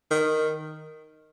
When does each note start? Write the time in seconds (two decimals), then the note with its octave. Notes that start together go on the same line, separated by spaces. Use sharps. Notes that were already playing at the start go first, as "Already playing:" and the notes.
0.11 D#3